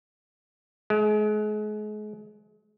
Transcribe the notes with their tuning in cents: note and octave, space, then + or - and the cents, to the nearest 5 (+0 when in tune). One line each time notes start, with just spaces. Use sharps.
G#3 +35